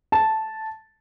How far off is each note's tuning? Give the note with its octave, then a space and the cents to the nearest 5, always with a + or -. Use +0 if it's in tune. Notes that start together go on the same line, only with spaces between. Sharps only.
A5 -5